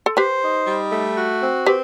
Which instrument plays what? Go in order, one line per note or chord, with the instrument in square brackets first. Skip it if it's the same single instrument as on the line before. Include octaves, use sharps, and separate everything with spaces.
[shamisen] A4
[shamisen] G4 B4 [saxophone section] C5
[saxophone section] D#4
G3
A3
F#4
C4
[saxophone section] C4 [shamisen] G4 B4